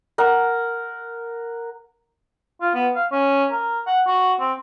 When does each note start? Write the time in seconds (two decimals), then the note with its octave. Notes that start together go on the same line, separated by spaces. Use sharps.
0.18 A#4 F#5
2.61 F4
2.74 B3
2.95 F5
3.11 C#4
3.51 A#4
3.87 F#5
4.07 F#4
4.40 C4